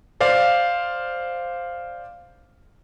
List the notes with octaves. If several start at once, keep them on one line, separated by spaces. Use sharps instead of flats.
C5 D5 F5